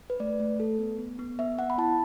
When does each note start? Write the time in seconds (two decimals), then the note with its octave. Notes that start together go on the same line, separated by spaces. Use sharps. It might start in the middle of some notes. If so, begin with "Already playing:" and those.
0.10 B4
0.20 A3 D5
0.40 A3
0.60 A4
0.79 B3
0.99 B3
1.19 B3
1.39 B3 E5
1.58 B3 F#5
1.70 B5
1.78 E4 A5